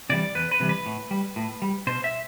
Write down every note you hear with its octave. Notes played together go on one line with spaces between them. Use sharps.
C3 E3 G3 D5
E2 B4
B4
C3 E3 G3
B4
A2
G3
A2
G3
B2 C5
E5